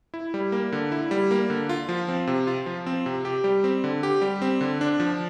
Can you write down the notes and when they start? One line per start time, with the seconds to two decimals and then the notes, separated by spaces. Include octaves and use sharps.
0.14 E4
0.34 G3
0.52 A#3
0.72 D3
0.92 E4
1.11 G3
1.31 A#3
1.50 D3
1.69 F4
1.89 F3
2.08 C4
2.27 C3
2.47 F4
2.66 F3
2.86 C4
3.06 C3
3.25 G4
3.44 G3
3.64 C4
3.84 D3
4.03 G4
4.22 G3
4.42 C4
4.61 D3
4.81 D4
5.00 F3